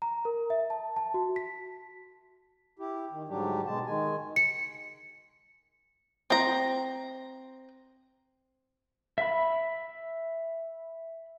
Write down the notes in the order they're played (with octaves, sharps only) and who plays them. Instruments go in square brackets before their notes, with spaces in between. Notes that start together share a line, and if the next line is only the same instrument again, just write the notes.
[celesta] A#5
A#4
E5
A5
A5
F#4
B6
[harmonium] E4 G4
D#3
G#2 D3 F#3 G3 D4 G4
B2 G#3 A5
D#3 G#3 G#5
[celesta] C#7
[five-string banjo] C4 A#5
[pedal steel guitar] E5 B5